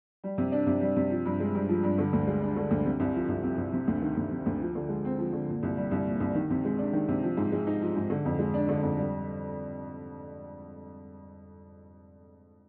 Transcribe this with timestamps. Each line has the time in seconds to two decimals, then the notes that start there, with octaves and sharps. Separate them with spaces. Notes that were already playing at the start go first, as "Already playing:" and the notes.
0.24 G3
0.38 C3
0.52 D4
0.67 C3
0.81 G3
0.96 C3
1.10 F3
1.26 G2
1.40 G#3
1.55 G2
1.69 F3
1.83 G2
1.98 D3
2.13 D2
2.27 G#3
2.42 D4
2.57 D3
2.71 D2
2.85 C3
3.00 C2
3.14 F3
3.29 C2
3.43 C3
3.58 C2
3.73 C3
3.87 D2
4.02 D#3
4.17 D2
4.31 C3
4.46 D2
4.61 F3
4.75 D3
4.89 G#3
5.05 C4
5.19 F3
5.33 D3
5.48 A#2
5.63 C2
5.77 G3
5.91 C2
6.07 A#2
6.20 C2
6.35 D#3
6.50 C3
6.65 G#3
6.78 D4
6.93 D#3
7.08 C3
7.23 F3
7.37 G#2
7.52 G#3
7.67 D#4
7.81 F3
7.96 G#2
8.10 D3
8.25 F2
8.39 G#3
8.54 D4
8.69 D3
8.82 F2
8.97 G3